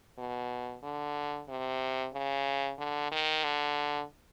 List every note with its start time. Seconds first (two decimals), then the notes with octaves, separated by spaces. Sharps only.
0.18 B2
0.83 D3
1.48 C3
2.13 C#3
2.78 D3
3.11 D#3
3.44 D3